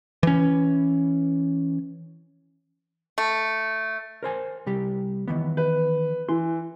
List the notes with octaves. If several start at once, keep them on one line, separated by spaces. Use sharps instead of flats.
E3 C#4
A3
A#4 C5 G#5
C3 G3 G4
D#3 E3 B3
B4
E3 C6